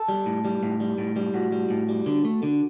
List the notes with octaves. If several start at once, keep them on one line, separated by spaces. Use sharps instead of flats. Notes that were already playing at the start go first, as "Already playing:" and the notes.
Already playing: A4
G3
A2
G3
A2
G3
A2
G3
A2 F#4
G3
A2
G3
D3
A3
D3